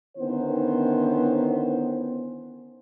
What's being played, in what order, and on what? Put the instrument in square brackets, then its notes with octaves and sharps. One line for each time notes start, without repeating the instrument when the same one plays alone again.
[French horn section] D3 D#3 B3 C#4 E4 C5